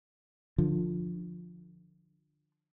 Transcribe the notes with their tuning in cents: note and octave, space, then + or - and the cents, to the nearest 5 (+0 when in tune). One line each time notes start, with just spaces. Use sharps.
D3 +20 F3 +5